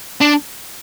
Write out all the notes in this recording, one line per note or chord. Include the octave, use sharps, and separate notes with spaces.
D4